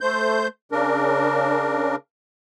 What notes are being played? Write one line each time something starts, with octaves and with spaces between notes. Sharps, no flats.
A3 C5 G6
C#3 D4 A#4